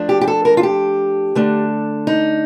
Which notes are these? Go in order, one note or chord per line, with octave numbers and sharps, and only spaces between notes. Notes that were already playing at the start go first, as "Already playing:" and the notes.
Already playing: F3 A3 D4
G4
G4
A4
A#4
F4
G4
D3 A3 D4
D#4